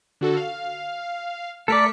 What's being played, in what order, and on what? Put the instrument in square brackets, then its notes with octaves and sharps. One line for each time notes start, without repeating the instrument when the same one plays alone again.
[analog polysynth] D3 F#4 A4
F5
[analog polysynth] A3 B6 C#7 [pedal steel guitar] A4 A#4 D5